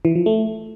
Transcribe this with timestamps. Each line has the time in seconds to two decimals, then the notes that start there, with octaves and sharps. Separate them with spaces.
0.05 E3
0.15 F3
0.26 A3